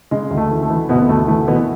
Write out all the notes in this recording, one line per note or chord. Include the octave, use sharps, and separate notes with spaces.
C#3 G#3
D2
A3
E3
A3
E3
D2 B2 B3
B3
D2 A3
E3 A3
B2 E3 B3